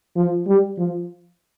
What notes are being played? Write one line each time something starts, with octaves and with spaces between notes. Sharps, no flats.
F3
G3
F3